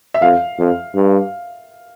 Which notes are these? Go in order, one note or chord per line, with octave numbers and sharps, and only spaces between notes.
E5
F2 F5
F2
G2